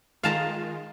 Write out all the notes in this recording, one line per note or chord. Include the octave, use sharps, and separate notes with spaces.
D#3 G#3 F4 F5 A5 A#5